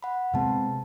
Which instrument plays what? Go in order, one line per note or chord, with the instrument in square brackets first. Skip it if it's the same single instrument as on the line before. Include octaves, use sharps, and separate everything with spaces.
[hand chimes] F#5 B5
[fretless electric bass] C3 G#3 C4 [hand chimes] B3 A5